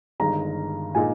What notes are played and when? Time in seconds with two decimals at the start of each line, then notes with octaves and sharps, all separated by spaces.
0.20 G1 G2 D#3 G#3 A#5
0.95 A#2 G#3 D#4 G#5